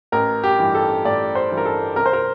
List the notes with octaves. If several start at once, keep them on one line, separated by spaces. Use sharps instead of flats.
A1 A#4
G4
G2 E3
A4
A1 D5
C5
G2 E3
A#4
A4
C2 A#4
C5
A#4